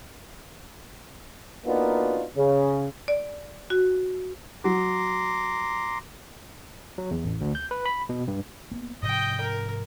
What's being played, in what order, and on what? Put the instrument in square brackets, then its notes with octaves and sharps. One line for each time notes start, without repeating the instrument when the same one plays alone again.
[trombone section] A#3 B3 D4 D#4 F4 F#4
C#3
[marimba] D5
F#4
[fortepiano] F#3 [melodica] A#5 C6 D6
[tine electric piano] F#3
E2
A1
D2
G6
B4
B5
B2
G2
[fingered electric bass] A#3 B3
[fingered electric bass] G#2 C3 F3 [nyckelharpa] D#5 G5
[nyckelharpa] A#4